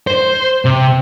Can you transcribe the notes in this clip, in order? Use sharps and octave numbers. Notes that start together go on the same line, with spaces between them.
C5
C3